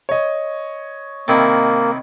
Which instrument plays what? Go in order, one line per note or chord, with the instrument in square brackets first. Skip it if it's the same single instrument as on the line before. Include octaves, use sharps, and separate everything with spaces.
[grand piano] C#5 D#5
[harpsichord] C3 D#3 E4 [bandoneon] A#3